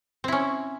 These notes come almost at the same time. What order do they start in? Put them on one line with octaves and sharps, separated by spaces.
C4 E4 C#4